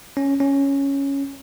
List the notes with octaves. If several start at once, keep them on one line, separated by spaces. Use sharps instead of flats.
C#4
C#4